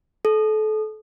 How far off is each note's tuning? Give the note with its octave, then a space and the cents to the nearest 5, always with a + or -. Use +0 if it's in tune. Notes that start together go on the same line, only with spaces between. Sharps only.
A4 -30